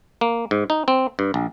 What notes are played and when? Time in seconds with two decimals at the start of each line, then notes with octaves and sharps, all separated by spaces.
0.21 A#3
0.51 G#2
0.70 D#4
0.88 C4
1.19 G2
1.34 A#1